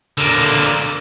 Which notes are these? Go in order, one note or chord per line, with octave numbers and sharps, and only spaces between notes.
D3 A#3